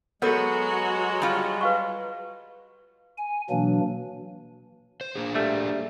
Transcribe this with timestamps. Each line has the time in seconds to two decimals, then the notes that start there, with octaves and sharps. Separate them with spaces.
0.22 F#3 G#3 B3 F#4 A4 A#4 C#5
1.22 G3 F4
1.61 B4 F5 C#6
3.17 G#5
3.50 B2 E3 F#3 A#3 D4
5.01 C5
5.16 A#3 D4 G#4
5.35 G3 A3 E5